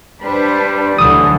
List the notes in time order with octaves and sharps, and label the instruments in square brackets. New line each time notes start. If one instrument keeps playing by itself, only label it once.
[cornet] G3 [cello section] D4 B4 C5
[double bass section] D2 E3 F#3 [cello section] D3 [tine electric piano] D#6